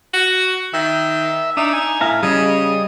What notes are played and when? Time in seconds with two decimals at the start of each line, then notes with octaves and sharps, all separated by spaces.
0.14 F#4
0.74 D#3 E5
1.57 D4 D#4 E5 D#6
1.73 G#5
2.01 A2 E5 F5 A#5
2.23 C#3 G3 D#5 D#6